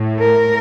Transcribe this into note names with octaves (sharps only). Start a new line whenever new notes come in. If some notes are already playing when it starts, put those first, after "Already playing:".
Already playing: A2 A3
A#4